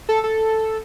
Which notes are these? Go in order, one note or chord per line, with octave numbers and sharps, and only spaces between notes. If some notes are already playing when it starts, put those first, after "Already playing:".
A4
A4